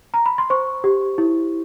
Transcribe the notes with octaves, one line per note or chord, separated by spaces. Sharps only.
A#5
B5
C6
C5 C#6
G4
E4